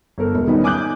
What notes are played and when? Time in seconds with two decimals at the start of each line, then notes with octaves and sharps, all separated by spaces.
0.18 G1 A4 A#4
0.34 E1
0.47 D#3 G3 B3 C#4 D#4
0.64 G#5 D6 D#6 F#6 G6